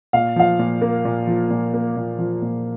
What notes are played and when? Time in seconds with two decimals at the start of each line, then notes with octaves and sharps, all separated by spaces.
0.13 A#2 F5
0.36 F3 F5
0.59 A#2
0.81 A#3
1.05 A#2
1.27 F3
1.51 A#2
1.74 A#3
1.97 A#2
2.18 F3
2.42 A#2